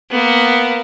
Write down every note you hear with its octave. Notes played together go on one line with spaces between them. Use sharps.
A#3 B3